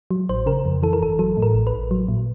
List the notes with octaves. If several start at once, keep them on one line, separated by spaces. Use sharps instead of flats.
F#3
A1 C5
C#3 A#4
F2
E3 A4
A#4
G1 A4
F#3 A4
A2
A#4
A1
B4
A1
F#3
A#2